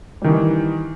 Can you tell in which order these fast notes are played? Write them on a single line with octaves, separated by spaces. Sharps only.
G3 D#3 E3